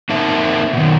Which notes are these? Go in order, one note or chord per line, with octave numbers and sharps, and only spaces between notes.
A#3 C4 D#4 E5 A5
B2 D#3